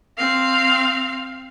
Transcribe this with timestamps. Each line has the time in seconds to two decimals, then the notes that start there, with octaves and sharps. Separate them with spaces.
0.18 C4 F5